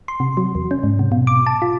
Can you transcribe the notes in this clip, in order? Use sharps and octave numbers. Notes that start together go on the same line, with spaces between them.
C6
C3
F#3
E2
C#4
G#2
C3
B2
D6
A5
F4